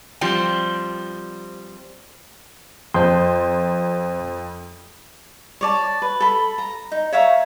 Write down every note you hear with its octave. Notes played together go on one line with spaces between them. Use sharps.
F3 G3 C4
F2 C5 C6
C#5 D5 A5
B4
A4 B5
A#5
D#4
C#5 E5 F5 A#5